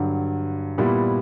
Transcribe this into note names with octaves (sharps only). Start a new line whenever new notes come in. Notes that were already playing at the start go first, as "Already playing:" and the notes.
Already playing: G2 D3 F#3
A#2 G3 B3 E4